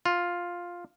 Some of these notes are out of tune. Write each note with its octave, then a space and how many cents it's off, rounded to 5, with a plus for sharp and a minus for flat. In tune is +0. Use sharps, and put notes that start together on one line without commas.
F4 +5